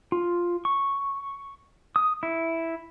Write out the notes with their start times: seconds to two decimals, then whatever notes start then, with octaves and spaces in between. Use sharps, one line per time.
0.12 F4
0.65 C#6
1.96 D#6
2.23 E4